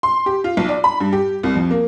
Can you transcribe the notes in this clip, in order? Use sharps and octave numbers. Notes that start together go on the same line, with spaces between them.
C6
G4
F4
B1
D5
B5
G2
G4
C2
F2
A#3